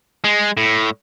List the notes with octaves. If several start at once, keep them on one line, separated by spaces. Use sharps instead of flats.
G#3
A2